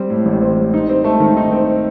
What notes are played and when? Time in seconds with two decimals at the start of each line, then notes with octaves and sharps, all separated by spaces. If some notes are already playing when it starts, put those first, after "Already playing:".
Already playing: G3 C4
0.10 A2
0.26 A1
0.41 C4
0.57 G3
0.74 D#4
0.89 C4
1.04 A3
1.20 D#3
1.37 D#4
1.52 C4